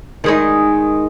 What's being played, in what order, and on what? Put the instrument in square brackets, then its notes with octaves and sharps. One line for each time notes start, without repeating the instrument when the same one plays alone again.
[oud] D#3 G#3 D#4